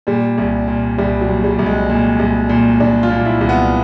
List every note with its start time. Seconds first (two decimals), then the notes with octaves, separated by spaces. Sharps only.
0.07 A#2 G3
0.38 C2
0.68 A#2
0.98 C2 G3
1.21 F#3
1.28 A#2
1.44 G3
1.59 C2
1.66 G#3
1.89 A#2
2.19 C2
2.49 A#2
2.80 C2 D4
3.03 F4
3.10 A#2
3.25 E4
3.41 C2
3.49 B3